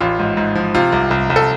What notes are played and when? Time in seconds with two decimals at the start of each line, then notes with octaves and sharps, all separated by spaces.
0.01 A1 F4
0.19 G#2
0.37 G#2
0.55 F3
0.75 C3 F4
0.92 C2
1.11 C2
1.30 C2
1.36 A4